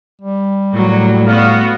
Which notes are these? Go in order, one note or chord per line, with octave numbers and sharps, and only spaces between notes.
G3
A2 F#3 A#3
B3 F#4 F5